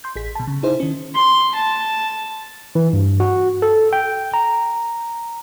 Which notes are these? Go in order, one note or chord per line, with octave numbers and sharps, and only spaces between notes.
C6 G6
A1 G#4 B6
B2 A5
C#3
D#4 E4 G#4 C5
D#3 C#4
C6
A5
E3
G2
F#4
A4
G5
A#5